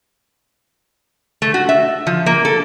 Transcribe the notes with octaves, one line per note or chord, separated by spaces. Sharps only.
A3
F#4
E5
F3
A#3
A4